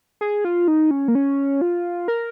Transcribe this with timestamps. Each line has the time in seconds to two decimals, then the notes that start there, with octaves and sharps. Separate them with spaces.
0.21 G#4
0.45 F4
0.68 D#4
0.91 C#4
1.08 A#3
1.15 C#4
1.61 F4
2.08 A#4